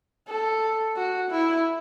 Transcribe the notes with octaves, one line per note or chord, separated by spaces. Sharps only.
A4
F#4
E4